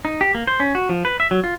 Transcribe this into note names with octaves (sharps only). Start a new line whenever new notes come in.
D#4
G4
A#3
C5
C#4
F#4
F3
B4
E5
F#3
F4